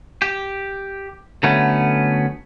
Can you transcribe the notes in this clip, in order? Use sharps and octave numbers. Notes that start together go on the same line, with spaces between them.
G4
D3 F#3 A3 B3 C#4